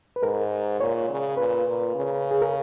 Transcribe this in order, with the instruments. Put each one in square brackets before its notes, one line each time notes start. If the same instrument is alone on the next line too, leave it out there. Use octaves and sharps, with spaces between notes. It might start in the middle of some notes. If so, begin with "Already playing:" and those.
[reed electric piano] B4
[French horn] G#2 [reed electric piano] A#4
[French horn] A#2 [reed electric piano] C#5
[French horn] C#3
[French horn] A#2 [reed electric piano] B4
[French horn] A#2
C#3
[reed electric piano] G#4
A#4